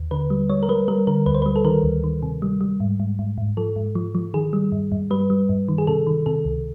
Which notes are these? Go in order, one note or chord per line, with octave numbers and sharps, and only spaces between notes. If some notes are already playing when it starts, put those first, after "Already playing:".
Already playing: D#2
D3 B4
G3
G3 C#5
A#4
G3 B4
G3 A#4
D3 A#4
D2 B4
C5
G3 B4
A4
D#3 A#4
D2
D#3
C3
G3
G3
G#2
G#2
G#2
G#2
F3 A4
G#2
F3
F3
D#3 G#4
G3
G2
G2
G3 B4
G3
G2
D#3
G#4
C3 A4
D#3
C3 A4
C#2